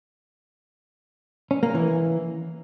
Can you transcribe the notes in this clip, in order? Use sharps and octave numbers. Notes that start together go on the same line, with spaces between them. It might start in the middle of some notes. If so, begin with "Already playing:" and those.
C#4
A#3
E3